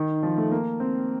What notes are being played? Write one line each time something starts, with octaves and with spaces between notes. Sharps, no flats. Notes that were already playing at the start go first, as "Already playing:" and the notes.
Already playing: D#3
F3
A3
A#3
C4